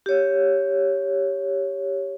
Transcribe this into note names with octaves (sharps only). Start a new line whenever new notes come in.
G4 C#5